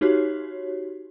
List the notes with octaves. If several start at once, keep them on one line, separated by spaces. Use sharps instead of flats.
D#4 F#4 G4 C#5